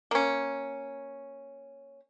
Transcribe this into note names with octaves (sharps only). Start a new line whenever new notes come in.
A#3 C#4